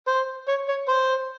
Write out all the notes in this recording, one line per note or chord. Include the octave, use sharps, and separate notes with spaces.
C5
C#5
C#5
C5